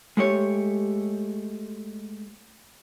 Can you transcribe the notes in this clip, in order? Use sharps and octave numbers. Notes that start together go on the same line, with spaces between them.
G#3 A3 G4 C#5